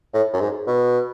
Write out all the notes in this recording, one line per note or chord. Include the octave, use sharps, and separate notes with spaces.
A2
F#2
G#2
B2